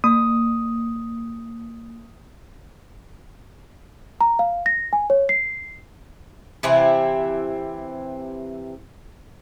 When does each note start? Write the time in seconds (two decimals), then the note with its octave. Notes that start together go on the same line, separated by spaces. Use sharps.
0.04 A#3 D#6
4.21 A#5
4.39 F5
4.66 A#6
4.93 G#5
5.10 C#5
5.29 C7
6.63 C3 E3 C4 E4